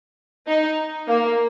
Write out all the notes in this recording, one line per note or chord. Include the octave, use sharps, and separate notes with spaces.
D#4
A#3